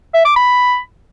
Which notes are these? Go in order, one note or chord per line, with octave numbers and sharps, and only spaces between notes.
E5
D6
B5